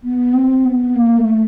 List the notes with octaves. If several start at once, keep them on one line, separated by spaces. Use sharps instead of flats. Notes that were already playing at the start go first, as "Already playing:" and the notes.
B3
C4
B3
A#3
A3